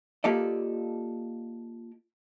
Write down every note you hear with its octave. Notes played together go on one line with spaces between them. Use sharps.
A#3 F4 G4 A4 D5 D#5